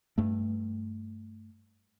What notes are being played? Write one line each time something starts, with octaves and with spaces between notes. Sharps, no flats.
G2 A3